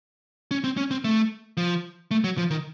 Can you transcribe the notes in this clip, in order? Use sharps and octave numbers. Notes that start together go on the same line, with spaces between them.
C#4
C4
C#4
C4
A3
F3
A3
F#3
F3
D#3